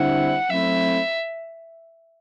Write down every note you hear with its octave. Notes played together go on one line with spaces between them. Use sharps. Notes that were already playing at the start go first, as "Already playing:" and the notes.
Already playing: D3 G3 C4 E4 F#5
F#3 A3 C4 E4 E5